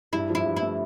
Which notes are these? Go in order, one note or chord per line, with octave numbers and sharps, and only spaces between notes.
G2 E4
F3 E4
G2
E4
A3